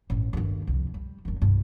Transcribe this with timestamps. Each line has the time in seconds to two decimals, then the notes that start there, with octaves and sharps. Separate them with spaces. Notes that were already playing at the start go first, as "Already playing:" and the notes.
0.10 A1 G2
0.33 G1 D#2
0.67 C2 F2
0.94 G3
1.25 F#1 D#2
1.42 C2 G2